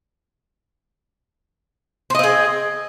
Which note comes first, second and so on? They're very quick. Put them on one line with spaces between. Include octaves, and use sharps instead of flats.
C5 D#5 C4 G#4